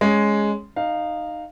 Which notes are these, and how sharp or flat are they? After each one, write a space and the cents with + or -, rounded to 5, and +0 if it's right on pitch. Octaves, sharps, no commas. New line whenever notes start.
G#3 +0 C#4 +0
D#4 -15 F5 +0